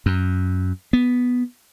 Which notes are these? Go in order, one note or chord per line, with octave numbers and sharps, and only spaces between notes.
F#2
B3